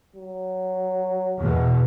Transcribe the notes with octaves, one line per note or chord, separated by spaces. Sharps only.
F#3
E2 B2